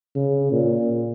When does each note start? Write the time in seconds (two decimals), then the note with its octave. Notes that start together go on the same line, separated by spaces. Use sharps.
0.16 C#3
0.52 A#2